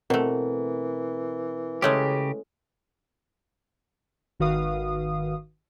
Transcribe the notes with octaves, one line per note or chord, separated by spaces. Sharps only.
B2 E3 A3 C4 A#4
C#3 G#3 A3 C#4 G4
G#1 D#3 F#4 B4 F5 D#6